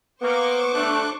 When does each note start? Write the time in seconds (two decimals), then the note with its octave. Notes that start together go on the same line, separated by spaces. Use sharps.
0.21 A#3 B3 C5 C#6 D6
0.74 D2 A3 D4 F#6